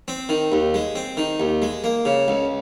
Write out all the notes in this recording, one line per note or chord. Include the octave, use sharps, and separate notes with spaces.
C4
D#3
D#2
G#3
C4
D#3
D#2
G#3
A#3
C#3
C#2